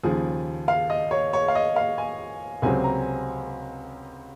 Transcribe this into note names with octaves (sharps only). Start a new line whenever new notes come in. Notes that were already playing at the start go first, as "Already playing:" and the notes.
D#2 C#3 F3 G#4
F5
D#5
C#5
C#5
F5
D#5
F5
G#5
C#2 C3 F#3 C4 G#5
A#5